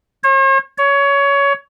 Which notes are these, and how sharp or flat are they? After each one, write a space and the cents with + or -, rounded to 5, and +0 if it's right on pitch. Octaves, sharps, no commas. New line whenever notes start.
C#5 -45
C#5 +20